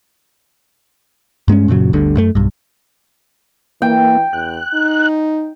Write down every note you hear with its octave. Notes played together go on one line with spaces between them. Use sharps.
G2 G#3 B3 C#4
F#2 A#2 C#3 F#3
G1 D2 G2 D3
F#2 A3
B1 G2
E3 A#3 G5
E2 F#6
D#4